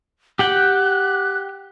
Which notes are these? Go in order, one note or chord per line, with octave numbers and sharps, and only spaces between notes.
G4 F#5 G5 F#6